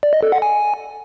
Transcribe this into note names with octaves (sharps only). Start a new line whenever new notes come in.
D5
D#5
A4
F#5
G#5